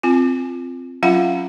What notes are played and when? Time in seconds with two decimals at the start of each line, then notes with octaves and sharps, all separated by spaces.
0.03 C4 F4 G#5
1.03 F#3 C#4 F4 F5 F#5 B5